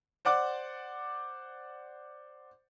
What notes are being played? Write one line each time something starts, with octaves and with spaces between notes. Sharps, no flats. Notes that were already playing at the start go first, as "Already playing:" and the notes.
C5 D5 F#5 D6